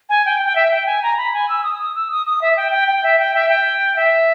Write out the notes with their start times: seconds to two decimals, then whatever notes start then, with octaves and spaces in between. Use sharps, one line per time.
0.09 G#5
0.25 G5
0.45 G5
0.55 E5
0.71 G5
0.86 G#5
1.02 A#5
1.17 B5
1.33 G#5
1.49 E6
1.64 D#6
1.79 D#6
1.95 E6
2.11 D#6
2.26 D#6
2.41 E5
2.57 G5
2.72 G5
2.88 G5
3.03 E5
3.19 G5
3.34 E5
3.49 G5
3.96 E5